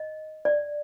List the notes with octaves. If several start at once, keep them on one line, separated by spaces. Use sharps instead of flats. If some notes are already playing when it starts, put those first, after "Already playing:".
Already playing: D#5
D5